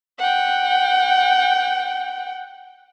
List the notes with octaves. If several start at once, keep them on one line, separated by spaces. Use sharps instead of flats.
F#5 G5